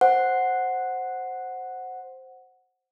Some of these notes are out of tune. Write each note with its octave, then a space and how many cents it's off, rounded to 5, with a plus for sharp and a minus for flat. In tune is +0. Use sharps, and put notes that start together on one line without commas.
C5 +0 F#5 +0